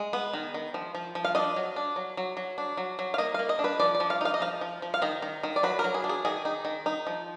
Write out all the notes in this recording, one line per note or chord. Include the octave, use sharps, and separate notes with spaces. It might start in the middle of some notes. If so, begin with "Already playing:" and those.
Already playing: G#3
B3
D#3
D#3
F3
F3
F3
F5
D4 D#5
F#3
D4
F#3
F#3
F#3
D4
F#3
F#3
F5
A#3 D#5
A#3 F5
D#5
D4
B4
F3 D5
D5
F3
F5
D#4 F5
D#5
F3 F5
F3
F3
F5
D#3 D#5
D#3
D#3
D5
F#3 B4
A#4
F#3
G#4
D4
G#4
D#3 G#4
D#4
D#3
D#4
F3